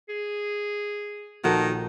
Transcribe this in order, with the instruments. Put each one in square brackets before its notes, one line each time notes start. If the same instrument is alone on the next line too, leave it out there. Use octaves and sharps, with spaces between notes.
[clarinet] G#4
[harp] A#1 G6 [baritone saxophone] D#3 [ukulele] F#4 A4